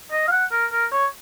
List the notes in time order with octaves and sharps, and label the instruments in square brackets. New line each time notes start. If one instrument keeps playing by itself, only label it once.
[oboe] D#5
F5
F#5
A#4
A#4
C#5